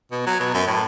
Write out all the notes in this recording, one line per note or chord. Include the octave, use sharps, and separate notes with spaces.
B2
F#3
B2
F#2
A2